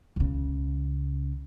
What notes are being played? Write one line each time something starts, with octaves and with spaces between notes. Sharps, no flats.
C#2 C#3